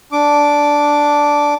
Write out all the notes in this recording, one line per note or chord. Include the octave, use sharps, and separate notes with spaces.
D4 D6